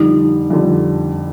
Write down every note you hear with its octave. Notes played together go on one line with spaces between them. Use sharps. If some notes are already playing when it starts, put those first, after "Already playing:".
Already playing: F2 D3 G3 D#4
F2 D3 G3